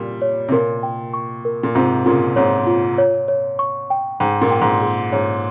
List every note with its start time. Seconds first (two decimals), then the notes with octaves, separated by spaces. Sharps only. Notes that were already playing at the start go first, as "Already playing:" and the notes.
Already playing: A#2 G3
0.22 C#5
0.49 C3
0.52 A#2 A#4
0.83 G5
1.14 C#6
1.45 A#4
1.63 A#2
1.75 G#2 C3 F4
2.06 A#2 C#3 F4
2.36 G#2 C3 C#5
2.67 F4
2.98 C#5
3.28 C#5
3.59 C#6
3.90 G5
4.20 G#2 G5
4.42 A#2
4.51 G5
4.62 G#2
4.82 G#4
5.12 G#2 C#5